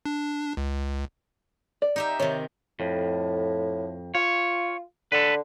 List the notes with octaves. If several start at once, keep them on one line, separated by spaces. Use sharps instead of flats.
D4
C#2
D5
D#4 G4 E5
C3 D#3 C#5
F2 A2
F4 C#5
D3 A4 B4